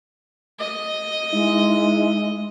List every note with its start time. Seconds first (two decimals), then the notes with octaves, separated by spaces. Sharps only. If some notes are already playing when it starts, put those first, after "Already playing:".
0.59 D#5
1.33 G#3 D#4 E4 E5